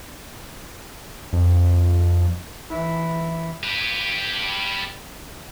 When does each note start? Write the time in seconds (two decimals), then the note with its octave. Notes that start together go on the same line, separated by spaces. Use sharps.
1.33 F2
2.70 E3 E4
3.63 G4 B4